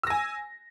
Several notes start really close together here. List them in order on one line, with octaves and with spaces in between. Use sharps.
E6 A#6 G#5